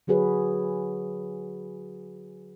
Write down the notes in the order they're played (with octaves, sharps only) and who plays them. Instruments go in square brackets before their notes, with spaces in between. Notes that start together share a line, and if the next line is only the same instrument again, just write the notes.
[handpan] D3 F#3 F#4 G#4 B4 C#5